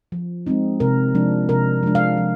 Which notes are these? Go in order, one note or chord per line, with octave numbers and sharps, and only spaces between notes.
F3
G#3 C4 D#4
C3 A#4
F3 G#3 D4
C3 A#4
F3 G#3 D4
F5
F3